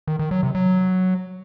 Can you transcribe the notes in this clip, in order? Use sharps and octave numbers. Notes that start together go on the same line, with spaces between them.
D#3
D#3
F#3
C3
F#3